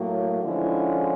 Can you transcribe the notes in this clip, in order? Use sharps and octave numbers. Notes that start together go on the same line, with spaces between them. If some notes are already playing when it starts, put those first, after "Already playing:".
Already playing: A2 F#3 A#3
D3 F3 G#3 C#4 E4